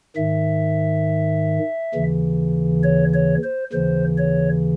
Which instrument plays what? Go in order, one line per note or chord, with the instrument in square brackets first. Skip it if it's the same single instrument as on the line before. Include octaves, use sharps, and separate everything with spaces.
[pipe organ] G#2 D#3 E5
D#2 C#3 E3
C#5
C#5
C5
D#2 C#3 E3 C5
C#5